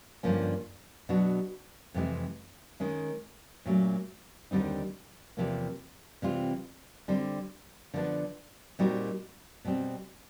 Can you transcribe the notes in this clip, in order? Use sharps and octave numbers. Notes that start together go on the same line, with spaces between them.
G2 D3 F3 A#3 C#4
B2 F#3 B3 D4 F#4
F2 C3 E3 G#3
D#3 G#3 C#4
A#2 F#3 A3 C#4
D#2 D3 G3 C4 D#4
E2 C3 F3 A#3
C3 E3 G3 C4 F4
D3 G3 C4
D3 F3 G#3 B3 D4
A#2 G3 C4 D#4 F#4
B2 G3 C4